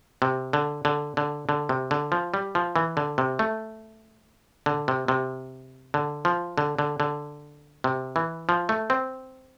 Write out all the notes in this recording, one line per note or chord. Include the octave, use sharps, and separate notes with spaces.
C3
D3
D3
D3
D3
C3
D3
F3
G3
F3
E3
D3
C3
A3
D3
C3
C3
D3
F3
D3
D3
D3
C3
E3
F3
A3
C4